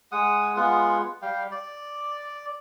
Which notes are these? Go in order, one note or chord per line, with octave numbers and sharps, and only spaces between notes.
G#3 F#5 D#6
G#3 B3 F4 F#5
G3 F5 G5
D5